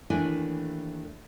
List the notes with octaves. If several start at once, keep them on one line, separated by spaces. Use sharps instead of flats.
D#2 E3 A3 D4 E4 G#5